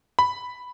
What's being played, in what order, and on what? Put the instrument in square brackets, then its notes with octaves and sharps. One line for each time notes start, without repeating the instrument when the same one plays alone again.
[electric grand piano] B5